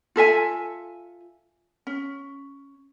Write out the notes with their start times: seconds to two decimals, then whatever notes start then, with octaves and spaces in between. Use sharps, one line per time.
0.16 F4 A4 E5 G#5
1.87 C#4